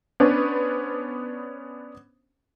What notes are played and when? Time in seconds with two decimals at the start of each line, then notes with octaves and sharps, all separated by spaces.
0.20 B3 C#4 D4 B4 C5